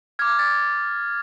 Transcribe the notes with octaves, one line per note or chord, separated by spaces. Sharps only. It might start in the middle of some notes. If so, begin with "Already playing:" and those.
D6 F6 G#6
A6